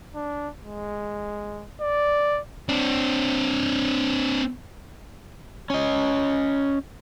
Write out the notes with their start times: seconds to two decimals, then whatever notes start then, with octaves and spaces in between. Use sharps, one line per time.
0.15 D4
0.64 G#3
1.81 D5
2.69 C4 D4
5.70 C#4 D#5